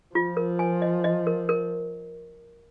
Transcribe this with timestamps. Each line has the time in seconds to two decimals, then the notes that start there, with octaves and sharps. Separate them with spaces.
0.15 F3 F4
0.37 A#4
0.59 G#5
0.82 D#5
1.04 D#5
1.27 A#4
1.49 A#4